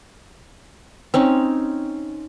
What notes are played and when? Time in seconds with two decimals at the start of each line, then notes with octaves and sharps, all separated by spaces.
1.14 C4 C#4 D#4